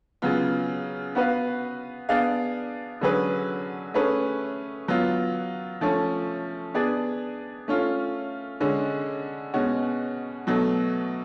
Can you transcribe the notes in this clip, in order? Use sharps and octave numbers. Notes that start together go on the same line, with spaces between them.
C#3 F#3 B3 F4
B3 F#4 B4 F5
B3 D4 G#4 D5 F5
D3 F#3 C#4 G#4 B4
A3 C#4 G#4 B4
F#3 B3 F4
F3 A3 C#4
B3 D4 G#4 D5
A3 C#4 F4
D3 G#3 C#4
B2 G#3 C#4 F#4
B2 F#3 A3